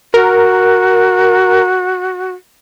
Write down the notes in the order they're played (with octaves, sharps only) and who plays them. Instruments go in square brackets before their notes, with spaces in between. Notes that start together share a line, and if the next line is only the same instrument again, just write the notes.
[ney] F#4 [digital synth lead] A#4